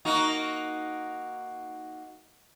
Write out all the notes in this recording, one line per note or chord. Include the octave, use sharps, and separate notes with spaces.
A#3 D#4 F#4